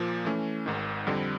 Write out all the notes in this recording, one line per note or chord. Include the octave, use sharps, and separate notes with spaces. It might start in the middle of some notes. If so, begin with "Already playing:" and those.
Already playing: A#2 F3 A#3
E3 A3 C#4
G#1 G#2 D#3
F2 D3 G3 C4